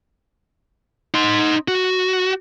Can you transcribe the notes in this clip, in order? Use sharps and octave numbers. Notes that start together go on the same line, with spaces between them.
D#4 C6
F#4